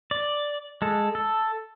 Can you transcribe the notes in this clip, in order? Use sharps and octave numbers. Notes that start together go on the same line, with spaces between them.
D5
G#3 A4
A4